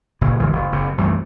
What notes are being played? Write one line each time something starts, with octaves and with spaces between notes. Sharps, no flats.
F#1 A#2 C#3
G1 D2 E3 G#3
F#1
F#1 C3
C2 F#2 E3 A3